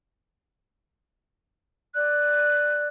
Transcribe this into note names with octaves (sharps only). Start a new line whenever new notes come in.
D5 F#6